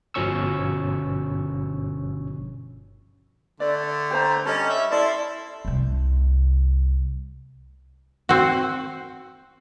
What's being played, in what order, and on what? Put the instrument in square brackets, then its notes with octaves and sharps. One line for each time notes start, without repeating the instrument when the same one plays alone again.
[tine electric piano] G1 B2 F3 C#4 C#6 E6
[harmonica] D3 A3 [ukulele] D5
[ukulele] G4 C5 A#5
[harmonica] G3 C#4 [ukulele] A4 D#5
[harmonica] E5
[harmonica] E4 A4 C6 [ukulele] D5
[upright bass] C2 A3
[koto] C4 F#4